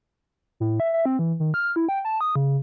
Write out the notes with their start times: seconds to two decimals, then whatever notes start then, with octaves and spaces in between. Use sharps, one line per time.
0.60 A2
0.80 E5
0.94 E5
1.06 C4
1.19 E3
1.40 D#3
1.54 F6
1.76 E4
1.89 G5
2.05 A5
2.21 D#6
2.36 C#3